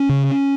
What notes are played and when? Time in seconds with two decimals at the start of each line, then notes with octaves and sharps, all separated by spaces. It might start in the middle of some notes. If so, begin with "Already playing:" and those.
Already playing: C#4
0.09 C#3